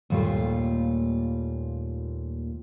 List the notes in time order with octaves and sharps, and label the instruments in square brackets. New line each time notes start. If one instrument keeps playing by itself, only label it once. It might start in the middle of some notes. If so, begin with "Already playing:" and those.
[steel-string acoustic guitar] D#2 A#2 G3 A3 F4